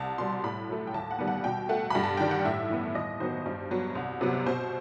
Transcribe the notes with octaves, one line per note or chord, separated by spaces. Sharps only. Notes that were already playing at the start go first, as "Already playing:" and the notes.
Already playing: C2 A5
B2 G3 C6
A2 B5
F#3 A3
G5
D#2 A5
F#5
D#3 G3 B3
F#5
B2 G5
A3 F#5
G2 B5
A5
D#3 G3 G5
F#5
A2 E5
E3 B3
D#2 D#5
D#3 F#3 B3 C5
G2
F#3 B3
C2
C3 F#3 B3
B2 C5